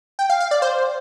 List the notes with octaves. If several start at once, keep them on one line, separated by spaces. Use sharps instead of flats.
G5
F5
F5
D5
C5